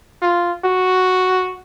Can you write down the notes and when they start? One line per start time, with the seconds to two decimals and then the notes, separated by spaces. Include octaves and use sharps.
0.22 F4
0.64 F#4